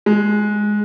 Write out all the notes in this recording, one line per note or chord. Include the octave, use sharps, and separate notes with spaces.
G#3